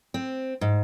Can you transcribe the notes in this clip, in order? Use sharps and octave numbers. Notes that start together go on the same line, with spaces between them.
C4
G#2